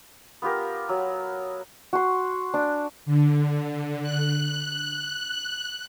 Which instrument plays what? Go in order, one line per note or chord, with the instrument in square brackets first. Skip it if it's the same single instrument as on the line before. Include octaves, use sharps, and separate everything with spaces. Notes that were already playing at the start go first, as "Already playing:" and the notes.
[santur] B3 F4 G4 A#4
F#3
F#4 C6
D4
[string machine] D3
F#6